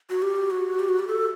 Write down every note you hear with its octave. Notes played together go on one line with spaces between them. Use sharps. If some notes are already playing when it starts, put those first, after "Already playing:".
F#4
G4
F#4
G4
F#4
G4
A4